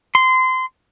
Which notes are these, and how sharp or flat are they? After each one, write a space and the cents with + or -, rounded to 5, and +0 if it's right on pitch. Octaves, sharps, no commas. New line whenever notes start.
C6 -25